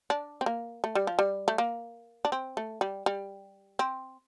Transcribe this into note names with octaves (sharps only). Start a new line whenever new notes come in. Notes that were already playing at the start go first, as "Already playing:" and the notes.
D4
C4
A#3
A3
G3
F3
G3
A3
A#3
D4
C4
A3
G3
G3
C4